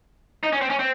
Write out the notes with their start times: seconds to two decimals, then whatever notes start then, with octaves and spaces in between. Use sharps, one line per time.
0.43 D#4
0.53 C#4
0.61 C4
0.70 C#4
0.79 C4